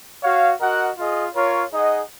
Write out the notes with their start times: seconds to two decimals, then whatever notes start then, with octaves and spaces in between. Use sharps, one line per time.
0.23 F#4 C#5 F5
0.60 F#4 A#4 D#5 F#5
0.97 F4 G#4 D#5
1.34 F4 A#4 C#5
1.71 D#4 G#4 D#5 F#5